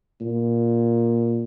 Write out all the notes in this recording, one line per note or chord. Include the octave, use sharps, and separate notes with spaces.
A#2